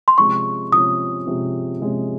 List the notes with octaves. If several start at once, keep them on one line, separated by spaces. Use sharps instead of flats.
C6
C3 F3 G#3 C#4 C#6
C3 F3 G#3 C#4 D#6
C3 F3 G#3 C#4
C3 F3 G#3 C#4